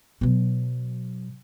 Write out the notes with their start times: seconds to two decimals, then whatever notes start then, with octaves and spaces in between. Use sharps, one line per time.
0.21 B2 F#3